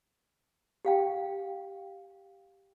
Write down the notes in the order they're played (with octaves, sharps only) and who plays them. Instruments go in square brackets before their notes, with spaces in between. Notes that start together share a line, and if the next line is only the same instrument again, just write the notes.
[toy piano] G4 F5 G5